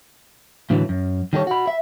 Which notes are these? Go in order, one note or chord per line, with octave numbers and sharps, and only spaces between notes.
A2 D3 E3 F#3
F#2
D#3 G3 A4 C#5
F#4 B5
E5